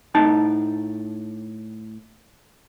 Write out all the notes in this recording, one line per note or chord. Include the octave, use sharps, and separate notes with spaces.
A2 D#4 A5